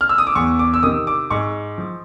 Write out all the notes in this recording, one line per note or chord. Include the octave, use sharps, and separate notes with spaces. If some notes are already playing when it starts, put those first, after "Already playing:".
F6
E6
D#6
D6
E2 C#6
D6
E6
C3 D#3 D#6
D6
G#2 C#6
F3